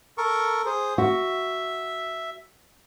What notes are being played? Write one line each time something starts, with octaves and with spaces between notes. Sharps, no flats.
A4 A#4 C#6
G#4 C5
F#4 E5